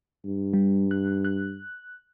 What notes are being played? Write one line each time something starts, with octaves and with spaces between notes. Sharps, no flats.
G2
G3
F#6
F#6